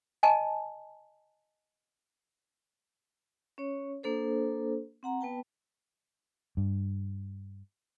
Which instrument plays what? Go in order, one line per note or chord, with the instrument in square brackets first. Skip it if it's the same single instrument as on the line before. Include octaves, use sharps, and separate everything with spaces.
[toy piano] D#5 G#5 A5
[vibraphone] C#4 C#5
A#3 D4 A4 C5
C4 F#5 A#5
B3 B4 G5 A5
[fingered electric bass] G2